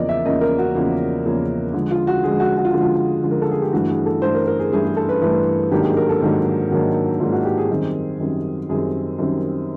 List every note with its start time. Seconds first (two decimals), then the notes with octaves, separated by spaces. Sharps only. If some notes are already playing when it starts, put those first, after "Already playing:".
Already playing: E2 C#3 F3 A#3 C#4 D5 D#5
0.09 E5
0.25 E2 C#3 F3 A#3 C#4 D#5
0.41 A#4
0.58 F#4
0.75 E2 C#3 F3 A#3 C#4
1.25 E2 C#3 F3 A#3 C#4
1.74 D3 F3 G#3
1.91 F4
2.07 F#4
2.23 D3 F3 G#3 G#4
2.40 F#4
2.57 F#4
2.65 F4
2.74 D3 F3 G#3
2.82 F4
3.23 D3 F3 G#3
3.31 A#4
3.42 A4
3.52 G#4
3.62 G4
3.73 G2 E3 A3 D4 F#4
3.90 G#4
4.06 A4
4.22 G2 E3 A3 D4 C5
4.35 A#4
4.47 A#4
4.59 G#4
4.72 G2 E3 A3 D4 G#4
4.85 G#4
4.97 A4
5.09 B4
5.21 G2 E3 A3 D4 B4
5.71 G#2 D#3 F#3 A#3 D4 G4
5.84 G#4
5.97 A#4
6.09 A4
6.21 G#2 D#3 F#3 A#3 D4
6.71 G#2 D#3 F#3 A#3 D4
7.20 G#2 D#3 F#3 A#3 D4 F4
7.32 F#4
7.45 G4
7.58 G#4
7.70 F#2 D#3 G3 C4
8.20 F#2 D#3 G3 C4
8.69 F#2 D#3 G3 C4 G#4
9.19 F#2 D#3 G3 C4